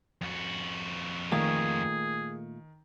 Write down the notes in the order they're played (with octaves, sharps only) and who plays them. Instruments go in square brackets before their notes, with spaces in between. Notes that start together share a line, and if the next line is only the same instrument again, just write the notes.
[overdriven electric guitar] F2 F#4
[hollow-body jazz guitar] A#2 A3 F5 [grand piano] D#3 [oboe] G#4